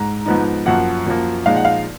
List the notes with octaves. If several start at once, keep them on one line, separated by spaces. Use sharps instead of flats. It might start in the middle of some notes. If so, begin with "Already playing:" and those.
Already playing: G#2 A#5
G#2 F3 B3 D#4
F#2 F3 A#3 F#5
F#2 F3 A#3
A#2 F3 G#3 D#4 F5
F#5
F5